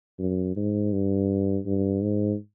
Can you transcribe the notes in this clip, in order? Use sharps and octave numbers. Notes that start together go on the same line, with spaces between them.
F#2
G#2
G2
G2
G#2